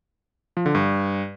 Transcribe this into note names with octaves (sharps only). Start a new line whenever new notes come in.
F3
D3
G2